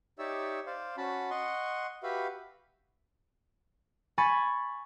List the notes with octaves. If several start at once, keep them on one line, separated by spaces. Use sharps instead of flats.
D#4 G4 C#5 D5 E5 E6
C5 D5 F5
C#4 F#4 A5 B5
D#5 F#5 C6 C#6
F#4 G4 B4 E5 F5 B5
G#5 B5 C#6 A6